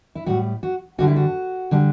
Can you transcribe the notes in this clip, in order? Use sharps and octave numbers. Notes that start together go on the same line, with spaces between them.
E4
A2 G3 F#4
F#4
G2 D3 G3 F#4
E4
F#4
D3 G3